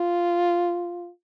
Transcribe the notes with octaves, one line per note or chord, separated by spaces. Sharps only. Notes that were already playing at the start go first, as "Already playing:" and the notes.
Already playing: F4